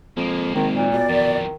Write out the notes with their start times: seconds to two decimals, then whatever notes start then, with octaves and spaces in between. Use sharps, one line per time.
0.17 F2 G#3 A#3
0.55 G#1 D#3
0.74 A#2
0.93 B2 D5
1.09 F2 D#3 E3